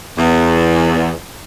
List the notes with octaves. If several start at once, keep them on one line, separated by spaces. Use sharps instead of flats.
E2